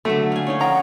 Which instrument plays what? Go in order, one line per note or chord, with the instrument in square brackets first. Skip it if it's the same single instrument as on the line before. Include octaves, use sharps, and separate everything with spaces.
[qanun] D3 F#3 [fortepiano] A3 [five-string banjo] A4
[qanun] F5 G#5
C#4 D#4 C#5
[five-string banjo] D#3 F3 A#5 [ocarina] F#5